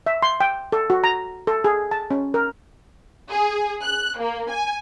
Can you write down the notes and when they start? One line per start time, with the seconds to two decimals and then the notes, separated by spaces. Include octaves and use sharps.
0.06 E5
0.23 C6
0.40 G5
0.72 A4
0.90 F#4
1.04 A#5
1.47 A4
1.64 G#4
1.91 A5
2.11 C#4
2.34 A#4
3.30 G#4
3.81 F#6
4.19 A#3
4.50 G#5